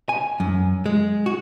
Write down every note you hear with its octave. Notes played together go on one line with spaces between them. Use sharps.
G#5
F#2
G#3
F#4